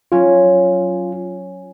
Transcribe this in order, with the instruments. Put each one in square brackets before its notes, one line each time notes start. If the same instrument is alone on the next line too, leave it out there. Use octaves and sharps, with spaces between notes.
[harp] F#3 C#4 [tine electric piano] F4